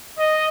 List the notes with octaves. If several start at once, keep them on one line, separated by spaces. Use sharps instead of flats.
D#5